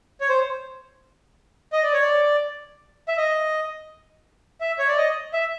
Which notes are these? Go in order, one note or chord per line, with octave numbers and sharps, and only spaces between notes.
C#5
C5
D#5
D5
C#5
D5
E5
D#5
E5
C#5
D5
D#5
E5